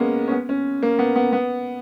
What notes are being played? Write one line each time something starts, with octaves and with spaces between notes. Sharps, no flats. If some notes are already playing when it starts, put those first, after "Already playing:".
Already playing: G#3 A#3 B3 C#4
C#4
B3
C#4
A#3
B3
B3
B3